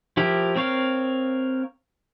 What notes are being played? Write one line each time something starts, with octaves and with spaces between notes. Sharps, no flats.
F3 E4 G4 A#4
C4 A#4 C#5 F5